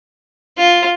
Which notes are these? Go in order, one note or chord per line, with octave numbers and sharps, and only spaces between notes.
F4